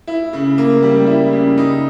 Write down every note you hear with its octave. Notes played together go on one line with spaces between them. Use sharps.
E4
C#3
A#3
G3
E4
C#3
D#4